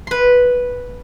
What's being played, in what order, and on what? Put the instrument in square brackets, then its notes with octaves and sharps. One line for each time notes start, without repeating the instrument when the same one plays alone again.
[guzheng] B4 C6